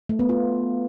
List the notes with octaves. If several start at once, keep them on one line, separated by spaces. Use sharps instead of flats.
A3
B3
F4